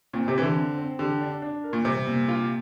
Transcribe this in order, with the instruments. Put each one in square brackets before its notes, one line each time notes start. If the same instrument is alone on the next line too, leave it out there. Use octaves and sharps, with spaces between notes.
[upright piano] A#2 [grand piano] C4
[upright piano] C3
[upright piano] E3 [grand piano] C4
[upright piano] D3
[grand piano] C4
C4
[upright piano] D3 [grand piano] G4
[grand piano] D4
D4
A#4
[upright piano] A#2
[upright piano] C3 [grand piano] G3
[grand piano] A#2
F4